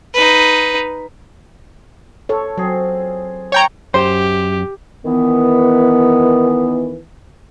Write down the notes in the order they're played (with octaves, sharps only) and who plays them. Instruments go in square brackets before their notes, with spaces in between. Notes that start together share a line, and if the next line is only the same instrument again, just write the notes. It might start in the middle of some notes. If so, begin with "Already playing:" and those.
[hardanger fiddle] D#4 B4
[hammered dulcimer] F4 [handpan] A4 C#5
[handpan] F#3 [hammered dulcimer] C4 G#4
[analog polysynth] C#5 G5 A#5
[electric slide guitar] F#2 [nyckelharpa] G4 [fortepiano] C5
[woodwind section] D#3 E3 B3